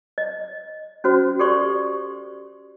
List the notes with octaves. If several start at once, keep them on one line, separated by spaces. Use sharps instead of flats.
D#5
C#4 F#4 C5
G4 A4 D5 C6 C#6